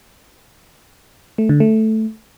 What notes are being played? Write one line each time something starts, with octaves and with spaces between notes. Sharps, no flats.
A3
D3
A3